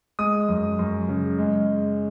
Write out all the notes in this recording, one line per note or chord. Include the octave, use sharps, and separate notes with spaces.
G#3 D#6
F#2
F#2
C#3
G#3